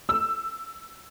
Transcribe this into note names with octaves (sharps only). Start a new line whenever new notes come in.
E6